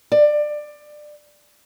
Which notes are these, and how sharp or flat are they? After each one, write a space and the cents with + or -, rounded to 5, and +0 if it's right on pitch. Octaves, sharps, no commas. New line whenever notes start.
D5 +20